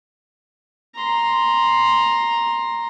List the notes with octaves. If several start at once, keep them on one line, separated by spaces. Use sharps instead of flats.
A#5 C6